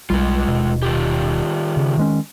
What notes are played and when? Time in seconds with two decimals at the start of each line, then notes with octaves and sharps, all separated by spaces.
0.10 B1 G3 G#3 F4
0.48 D#1 B2
0.82 D#3 F4 G4
1.77 C#3
1.98 D#3 G#3 C#4